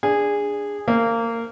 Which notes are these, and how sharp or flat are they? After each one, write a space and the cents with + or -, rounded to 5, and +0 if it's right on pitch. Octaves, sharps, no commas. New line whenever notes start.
D4 +0 G#4 -15
A#3 -20 C5 +0